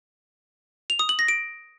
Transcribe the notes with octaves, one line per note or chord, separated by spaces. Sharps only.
F7
D#6
F#7
A#6
D7